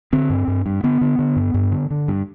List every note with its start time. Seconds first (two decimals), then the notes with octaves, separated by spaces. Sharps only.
0.13 D3 C4
0.30 G2
0.48 G2
0.66 G2
0.83 D3 B3
1.01 D3
1.19 D3
1.36 G2
1.54 G2
1.72 D3
1.91 D3
2.08 G2